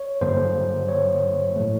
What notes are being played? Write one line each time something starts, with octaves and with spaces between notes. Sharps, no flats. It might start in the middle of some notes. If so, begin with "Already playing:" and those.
Already playing: C#5
G2 D3 F#3 A#3 C5
C#5
A2 F3 A3